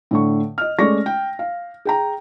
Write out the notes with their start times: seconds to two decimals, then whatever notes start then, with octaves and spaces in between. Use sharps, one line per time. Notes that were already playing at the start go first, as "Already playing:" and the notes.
0.11 A2 D3 C#6
0.58 D#5 F6
0.78 G#3 A3 C#4 D5 C#6 A#6
1.06 G5
1.39 F5
1.85 G#4 G5 A#5